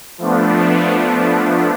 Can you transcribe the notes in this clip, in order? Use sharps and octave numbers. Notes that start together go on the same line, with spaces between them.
F3 A3 B3 D4